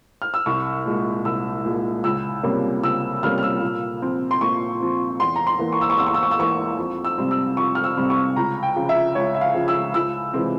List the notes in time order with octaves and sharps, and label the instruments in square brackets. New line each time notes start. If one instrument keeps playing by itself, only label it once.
[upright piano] F6
E6
C2 C#6
A#2 G#3
C2 E6
A#2 G#3
C#2 E6
C3 G3 A#3 C#4
C#2 E6
C3 G3 A#3 C#4 F6
F6
E6
A#2
F3 C4
C6
A#2 C#6
F3 C4
E2 C6
A#5
C6
E3 A#3
C#6
E6
C#6
E2 E6
C#6
E6
C#6
E6
E3 A#3 C#6
F2
E6
C3 G3 C4
E6
F2 C#6
F6
E6
C3 G3 C4
C#6
C#2 A#5
G5
C#3 F3
E5
C#2 C#5
E5
F5
C#3 F3
E6
C#2 E6
C3 E3 G#3 C4